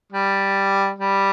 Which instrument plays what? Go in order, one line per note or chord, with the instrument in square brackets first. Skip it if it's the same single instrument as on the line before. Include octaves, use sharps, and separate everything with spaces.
[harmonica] G3
G3